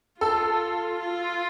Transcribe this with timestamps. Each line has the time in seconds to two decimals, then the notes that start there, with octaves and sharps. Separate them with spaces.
0.21 F4 A4
1.01 F4